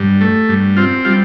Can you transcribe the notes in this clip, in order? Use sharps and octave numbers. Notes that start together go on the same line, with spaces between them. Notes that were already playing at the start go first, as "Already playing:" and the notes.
Already playing: G2
A3
G2
C4 F4
G3 F4